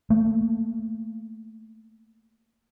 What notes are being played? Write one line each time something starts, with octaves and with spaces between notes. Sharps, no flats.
A3 A#3